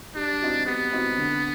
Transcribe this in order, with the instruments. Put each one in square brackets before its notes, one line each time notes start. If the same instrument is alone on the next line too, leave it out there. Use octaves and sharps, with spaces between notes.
[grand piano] G3 [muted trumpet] D4
[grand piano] C4 D#4 F#4
[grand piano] G3 [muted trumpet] B3
[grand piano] C4 D#4 F#4
D3